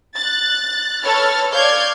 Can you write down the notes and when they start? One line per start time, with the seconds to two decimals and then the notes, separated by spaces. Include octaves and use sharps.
0.15 F#6 A6
1.03 A4 B4 C#5 F6 A6
1.53 C#5 D5 F5 F6 G6 G#6